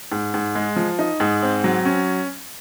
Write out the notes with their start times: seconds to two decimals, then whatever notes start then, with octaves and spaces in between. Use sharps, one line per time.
0.12 G#2
0.34 G#2
0.55 G#3
0.76 F3
0.99 D#4
1.20 G#2
1.42 C4
1.64 F#3
1.85 C#4